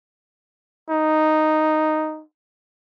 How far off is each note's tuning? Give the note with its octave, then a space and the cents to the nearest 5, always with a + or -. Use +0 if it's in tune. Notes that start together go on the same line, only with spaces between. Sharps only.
D#4 -5